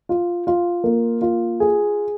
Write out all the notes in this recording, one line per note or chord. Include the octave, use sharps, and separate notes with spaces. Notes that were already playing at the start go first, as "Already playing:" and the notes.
F4
F4
A#3
F4
G#4